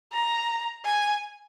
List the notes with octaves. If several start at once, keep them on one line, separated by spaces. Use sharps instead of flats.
A#5
G#5